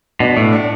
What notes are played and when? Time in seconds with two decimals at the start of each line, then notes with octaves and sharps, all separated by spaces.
0.20 B2 D4
0.36 A2 D4
0.52 D4